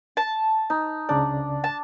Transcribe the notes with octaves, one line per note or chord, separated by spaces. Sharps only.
A5
D#4
C#2 C#3 D4 D5
A5